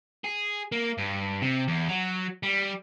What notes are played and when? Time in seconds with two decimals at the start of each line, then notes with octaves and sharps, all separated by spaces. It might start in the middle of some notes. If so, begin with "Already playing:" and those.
0.24 G#4
0.72 A#3
0.98 G2
1.42 C3
1.68 E2
1.89 F#3
2.43 G3